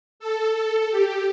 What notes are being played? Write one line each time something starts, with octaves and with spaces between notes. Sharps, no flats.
A4
G4